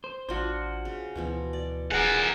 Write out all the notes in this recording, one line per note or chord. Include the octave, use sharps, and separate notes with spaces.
C5
A1 D4 F4 F#4 C5
C#3
D2 B2 E3 F3
D5
D#1 G#4 A#4 F#5